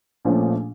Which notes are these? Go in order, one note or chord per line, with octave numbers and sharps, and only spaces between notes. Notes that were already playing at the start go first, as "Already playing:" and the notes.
A#1 A#2 F3 A3 C#4